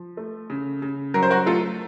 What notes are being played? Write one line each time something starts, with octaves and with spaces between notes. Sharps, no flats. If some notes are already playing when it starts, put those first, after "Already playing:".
Already playing: F3
A3
C#3
C#3
F#3 A#4
C5
F#4 A#4
A3 F4 A4